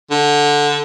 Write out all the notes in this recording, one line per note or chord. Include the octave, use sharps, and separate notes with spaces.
D3